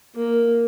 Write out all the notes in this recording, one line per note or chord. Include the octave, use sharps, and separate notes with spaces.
A#3